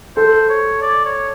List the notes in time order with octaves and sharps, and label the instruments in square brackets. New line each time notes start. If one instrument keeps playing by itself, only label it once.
[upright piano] A4 [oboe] C5
[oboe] C#5
D5
C#5